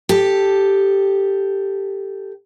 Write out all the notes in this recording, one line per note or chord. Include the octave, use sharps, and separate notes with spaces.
G4 A4